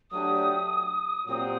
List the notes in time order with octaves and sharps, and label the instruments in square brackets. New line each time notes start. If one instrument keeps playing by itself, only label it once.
[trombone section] F#3 A3 D4 G4 [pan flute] D#6
[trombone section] A#2 F#3 C4 G4 [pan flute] D#6